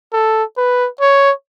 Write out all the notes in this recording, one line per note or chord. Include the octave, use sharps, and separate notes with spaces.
A4
B4
C#5